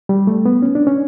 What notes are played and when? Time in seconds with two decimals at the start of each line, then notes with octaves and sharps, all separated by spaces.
0.09 G3
0.27 A3
0.46 B3
0.62 C#4
0.75 D4
0.87 C#4